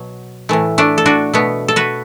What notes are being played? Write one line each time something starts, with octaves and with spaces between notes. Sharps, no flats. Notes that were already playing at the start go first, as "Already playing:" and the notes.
Already playing: B2 F#3
A2 E3 A3
A3 D4
A4
D4 F#4
B2 A3 B3
A4
F#4 B4